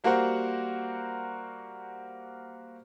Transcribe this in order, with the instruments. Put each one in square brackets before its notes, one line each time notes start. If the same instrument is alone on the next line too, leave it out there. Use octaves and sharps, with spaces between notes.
[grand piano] G3 A#3 F#4 A#4 C5 F#5